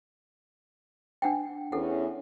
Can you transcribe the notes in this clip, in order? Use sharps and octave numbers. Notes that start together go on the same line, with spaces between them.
D4 F#5 G5
E2 C#4 A4 F#5